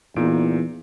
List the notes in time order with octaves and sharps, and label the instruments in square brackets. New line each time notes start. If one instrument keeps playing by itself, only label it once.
[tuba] E2 [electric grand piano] A#2 D#4 D7